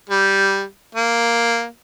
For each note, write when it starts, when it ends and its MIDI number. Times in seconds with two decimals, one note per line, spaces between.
0.10 0.63 55
0.95 1.65 58